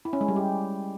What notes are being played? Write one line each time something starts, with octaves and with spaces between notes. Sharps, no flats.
E4
C#4
G#3
G3
G4